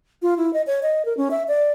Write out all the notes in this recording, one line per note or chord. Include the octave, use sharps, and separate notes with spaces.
F4
E4
D#5
C#5
D#5
A#4
C#4
E5
D5